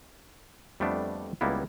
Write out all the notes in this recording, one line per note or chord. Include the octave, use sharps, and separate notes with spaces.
F2 G3 A3 B3 D4
C#2 G3 A#3 B3 E4